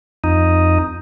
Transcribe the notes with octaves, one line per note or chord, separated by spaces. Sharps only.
F2 D#4